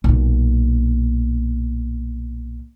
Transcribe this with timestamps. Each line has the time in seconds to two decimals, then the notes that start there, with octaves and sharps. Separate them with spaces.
0.04 B1 A#2